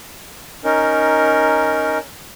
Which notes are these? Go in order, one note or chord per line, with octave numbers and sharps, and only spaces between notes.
C#4 D#4 A#4